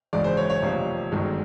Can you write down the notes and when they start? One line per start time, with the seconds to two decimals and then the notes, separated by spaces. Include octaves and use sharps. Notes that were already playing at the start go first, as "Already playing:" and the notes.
0.13 G#1 F#2 C#3 E3 G#3 D5
0.24 C5
0.37 C#5
0.50 C#5
0.62 F1 F2 D3 G3 A#3
1.12 G1 F#2 D#3 G#3